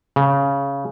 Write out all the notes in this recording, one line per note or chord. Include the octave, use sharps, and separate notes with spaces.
C#3